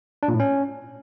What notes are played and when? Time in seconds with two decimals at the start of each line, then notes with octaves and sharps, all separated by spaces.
0.23 D4
0.28 A#2
0.34 A2
0.40 C#4